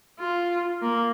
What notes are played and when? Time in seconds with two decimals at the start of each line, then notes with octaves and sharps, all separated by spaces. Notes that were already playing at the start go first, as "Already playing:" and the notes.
0.19 F4
0.82 A#3